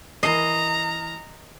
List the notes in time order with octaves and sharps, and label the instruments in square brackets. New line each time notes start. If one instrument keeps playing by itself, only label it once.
[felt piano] E3 A#4 C7 [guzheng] D#5 [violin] A#5